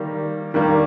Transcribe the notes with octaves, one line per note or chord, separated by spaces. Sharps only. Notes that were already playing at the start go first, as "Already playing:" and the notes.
Already playing: D#3 G3 A#3
D#3 G3 A#3